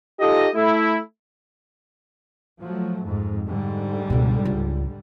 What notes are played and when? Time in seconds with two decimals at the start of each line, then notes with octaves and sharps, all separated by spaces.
0.20 D#4 F4 G4 A4 D#5
0.55 A3 E4
2.59 F3 F#3 A3
3.03 F2 G#2
3.46 G#2 D3 G3
4.10 C#2 B2
4.45 C#2